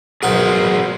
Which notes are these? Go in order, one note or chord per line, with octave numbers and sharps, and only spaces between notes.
B1 D#4 G#4 A#4 C5 F#5